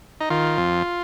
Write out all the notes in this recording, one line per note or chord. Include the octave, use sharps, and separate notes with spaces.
D#4
D#3 F4
F2